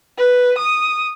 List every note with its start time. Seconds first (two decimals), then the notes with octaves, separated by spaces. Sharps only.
0.18 B4
0.58 D#6